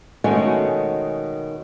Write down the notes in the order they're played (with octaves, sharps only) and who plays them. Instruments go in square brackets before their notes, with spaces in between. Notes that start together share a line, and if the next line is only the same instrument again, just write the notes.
[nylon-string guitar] B2 D#3 G#3 A3 C#4 F#4